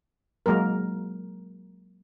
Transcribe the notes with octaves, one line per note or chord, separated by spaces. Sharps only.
F#3 G#3 A#3 A#4